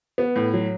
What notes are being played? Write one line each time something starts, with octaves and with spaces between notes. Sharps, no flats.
B3
A2
F#3